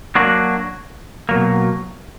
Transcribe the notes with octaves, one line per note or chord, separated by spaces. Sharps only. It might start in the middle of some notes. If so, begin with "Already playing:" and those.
F#3 A#3 D4 F#4
B2 F#3 A#3